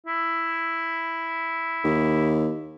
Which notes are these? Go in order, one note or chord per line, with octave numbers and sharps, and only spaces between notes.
E4
D#2